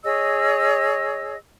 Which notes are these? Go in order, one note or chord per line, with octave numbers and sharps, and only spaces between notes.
G#4 C#5 D#5 E6